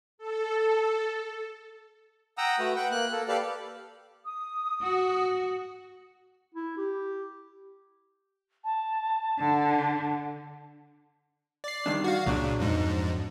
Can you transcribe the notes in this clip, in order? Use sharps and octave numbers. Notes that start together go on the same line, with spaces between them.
A4
F#5 G5 A#5 D#6 E6
A3 F#4 B4
B4 F#5 G5
A#3 F#6
A#3 A4
G4 A4 B4 D5 F5
D#6
F#4
E4
G4
A5
D3
D5 C7
D#3 G3 D4
F#4 F5
C#2 A#2 F#3 D4
F2 G#2